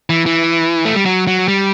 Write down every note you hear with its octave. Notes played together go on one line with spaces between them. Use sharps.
E3
E3
A3
G3
F#3
F#3
G3